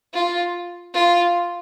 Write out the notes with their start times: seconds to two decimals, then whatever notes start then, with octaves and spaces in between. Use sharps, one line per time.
0.14 F4
0.94 F4